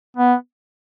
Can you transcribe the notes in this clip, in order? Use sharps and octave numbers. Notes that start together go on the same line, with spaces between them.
B3